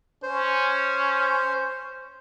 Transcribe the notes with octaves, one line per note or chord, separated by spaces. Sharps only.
C#4 C5